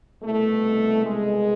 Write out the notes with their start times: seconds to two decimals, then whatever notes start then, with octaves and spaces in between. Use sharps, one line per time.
0.22 C2 B2 A3
1.05 G#3